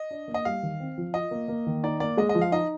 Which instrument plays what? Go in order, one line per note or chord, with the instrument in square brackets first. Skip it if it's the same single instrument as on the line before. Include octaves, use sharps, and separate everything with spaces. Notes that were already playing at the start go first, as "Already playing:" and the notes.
Already playing: [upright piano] D#5
[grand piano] D4
A#3
[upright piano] D#5
[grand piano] G3 [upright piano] F5
[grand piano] D#3
C4
F3
[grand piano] F4 [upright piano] D#5
[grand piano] A#3
A#3
D#3
[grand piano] D#4 [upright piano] D5
[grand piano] A#3 [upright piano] D5
[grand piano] G#3 [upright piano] D#5
[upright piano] D#5
[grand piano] F3
[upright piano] F5
[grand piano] D#4 [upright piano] D#5